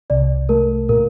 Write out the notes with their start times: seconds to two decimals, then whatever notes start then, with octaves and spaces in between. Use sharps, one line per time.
0.10 C2 D5
0.49 A3 A#4
0.89 A#2 A#4